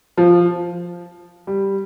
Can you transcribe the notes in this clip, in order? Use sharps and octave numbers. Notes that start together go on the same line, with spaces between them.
F3
G3